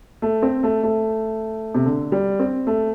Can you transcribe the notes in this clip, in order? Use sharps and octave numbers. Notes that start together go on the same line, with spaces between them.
A3
C4
A3
A3
C3
D3
G3
C4
A3